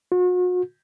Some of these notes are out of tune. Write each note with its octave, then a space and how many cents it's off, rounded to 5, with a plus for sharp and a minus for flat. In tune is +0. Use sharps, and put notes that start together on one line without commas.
F#4 -40